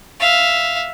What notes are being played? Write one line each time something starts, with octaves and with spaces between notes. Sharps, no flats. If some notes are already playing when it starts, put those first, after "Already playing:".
E5 F5